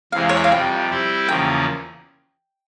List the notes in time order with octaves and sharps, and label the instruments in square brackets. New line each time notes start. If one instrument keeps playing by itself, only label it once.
[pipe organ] E2 C3 E3 G#3 C4 [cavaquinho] F5
[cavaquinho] C#5
E5
F5
[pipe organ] F2 C3 G3 [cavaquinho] G5
[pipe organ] G3 C4 E4 G4
[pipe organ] E2 C#3 F3 A#3 [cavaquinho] G5